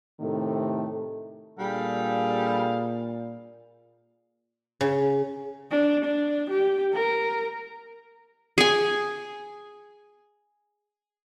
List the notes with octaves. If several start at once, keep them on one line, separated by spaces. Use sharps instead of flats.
A2 C3 D#3 A3
A#2 G3 D4 G#4 A4 F5
C#3
D4
D4
G4
A#4
G#4 G#5